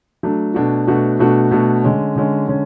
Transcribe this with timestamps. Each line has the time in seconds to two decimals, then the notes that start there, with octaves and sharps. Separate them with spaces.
0.23 F#3 A3 D4
0.54 B2 A3 D4 F#4
0.87 B2 A3 D4 F#4
1.19 B2 A3 D4 F#4
1.51 B2 A3 D4 F#4
1.84 D3 G#3 C#4
2.16 D3 G#3 C#4
2.48 D3 G#3 C#4